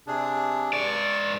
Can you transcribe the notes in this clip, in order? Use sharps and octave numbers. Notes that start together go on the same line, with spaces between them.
C3 D4 G#4
G#2 D5 C#6